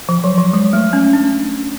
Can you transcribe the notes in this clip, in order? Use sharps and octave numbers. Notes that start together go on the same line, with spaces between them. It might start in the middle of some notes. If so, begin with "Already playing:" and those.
F3
F#3
F#3
G#3
A3
C#4
D4